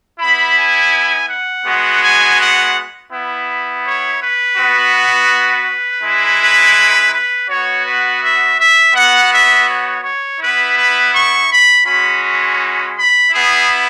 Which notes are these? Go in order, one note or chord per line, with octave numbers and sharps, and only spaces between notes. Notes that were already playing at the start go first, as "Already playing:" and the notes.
B3 E4 B5
G#5
F#5
G#3 B3 F#4
G#5
F#5
B3 E4
C#5
B4
B3 F#4
B4
G#3 E4
B4
B4
B3 F#4 C#5
B4
E5
E5
B3 F#4 F#5
E5
C#5
C#5
B3 E4 B4
B4
C#6
B5
G#3 C#4 F#4 B5
B5
B5
B3 E4 G#4